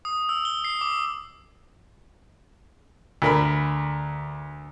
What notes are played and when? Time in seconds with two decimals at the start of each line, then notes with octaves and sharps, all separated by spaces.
0.05 D#6
0.29 E6
0.45 G7
0.64 C7
0.81 D6
3.22 D2 A#4 B5